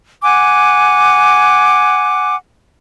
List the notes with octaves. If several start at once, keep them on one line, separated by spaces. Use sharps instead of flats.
F#5 G#5 D6 F#6